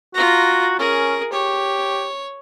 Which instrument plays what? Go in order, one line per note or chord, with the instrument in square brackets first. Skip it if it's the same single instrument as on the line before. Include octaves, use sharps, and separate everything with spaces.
[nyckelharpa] F4 A#5 [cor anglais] F#4
[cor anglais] C#4 [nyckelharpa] G#4 A#4
[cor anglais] G4 [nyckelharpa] C#5